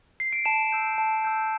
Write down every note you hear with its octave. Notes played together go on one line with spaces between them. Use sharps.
C7
D7
A5 E7
E6 G6
A5
E6 G6